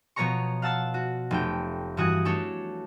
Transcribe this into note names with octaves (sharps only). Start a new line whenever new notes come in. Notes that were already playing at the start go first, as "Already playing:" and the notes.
B2 F3 B3 C#5 A#5 C#6
F5 F#5 A5 E6 A6
F#4
F1 A3 G5
G2 E3 F#4 D#6 F#6 G#6
A3 D4 A4 C#5